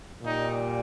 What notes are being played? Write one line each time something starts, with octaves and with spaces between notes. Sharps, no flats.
A#2 G3 D#4